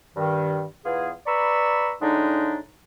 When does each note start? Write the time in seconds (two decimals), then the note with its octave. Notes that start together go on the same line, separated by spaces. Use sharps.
0.16 G2 D#3
0.85 E2 B3 F4 G#4
1.26 B4 D5 A#5 B5 C#6 E6
2.01 A2 D3 G#3 D4 D#4